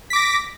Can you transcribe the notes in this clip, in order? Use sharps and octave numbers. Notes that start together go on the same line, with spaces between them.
D6 A#6 B6